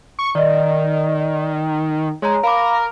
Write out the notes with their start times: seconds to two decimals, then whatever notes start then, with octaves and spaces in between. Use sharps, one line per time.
0.19 C#6
0.35 D#3 D5 D#5
2.22 G#3 C#5 A#5
2.43 A#4 F5 B5 D6